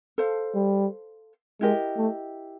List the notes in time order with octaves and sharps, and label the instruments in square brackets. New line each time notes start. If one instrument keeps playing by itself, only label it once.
[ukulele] A4 C5 F5
[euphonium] G3
[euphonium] G#3 [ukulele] E4 G4 A#4 D#5
[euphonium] A3